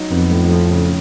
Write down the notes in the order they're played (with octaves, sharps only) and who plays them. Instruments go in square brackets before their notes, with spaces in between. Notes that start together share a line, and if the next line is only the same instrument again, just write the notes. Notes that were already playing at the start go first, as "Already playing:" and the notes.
Already playing: [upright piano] F#3 D#4
[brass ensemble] F2 [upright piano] B3
[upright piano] A2
F3
C#3